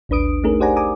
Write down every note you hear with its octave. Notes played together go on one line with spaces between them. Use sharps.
A1 D#2 D4 B4 D#6 D7
A3 C#4 D#4 G#4 A#4
G4 C5 D5 F#5 G#5 A#5
G#5 A#5 D6 D#6